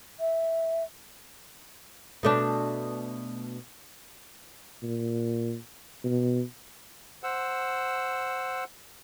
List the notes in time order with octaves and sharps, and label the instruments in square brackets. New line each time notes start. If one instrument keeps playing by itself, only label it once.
[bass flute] E5
[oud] B2 A3 D4
[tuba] A#2
B2
[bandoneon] C5 F#5 E6